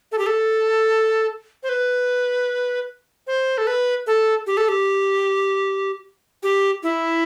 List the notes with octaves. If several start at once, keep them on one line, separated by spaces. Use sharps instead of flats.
A4
G4
A4
C5
B4
C5
A4
B4
A4
G4
A4
G4
G4
E4